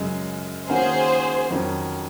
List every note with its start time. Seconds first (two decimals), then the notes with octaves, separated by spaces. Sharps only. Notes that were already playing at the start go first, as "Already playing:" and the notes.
Already playing: F#2 C#3 G#3
0.69 D#3 A#3 C#4 F#4 G#4 A#4 C5
1.51 F2 D#3 F#3 C#4